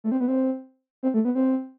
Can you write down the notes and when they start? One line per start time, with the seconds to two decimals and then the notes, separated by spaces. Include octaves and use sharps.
0.04 A3
0.12 C4
0.20 B3
0.28 C4
1.03 C4
1.14 A3
1.25 B3
1.35 C4